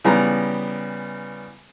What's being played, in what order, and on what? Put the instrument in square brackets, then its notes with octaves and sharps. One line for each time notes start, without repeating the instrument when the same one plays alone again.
[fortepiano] C#3 E3 G3 B3 A#5 B5